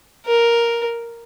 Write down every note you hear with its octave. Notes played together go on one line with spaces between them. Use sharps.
A#4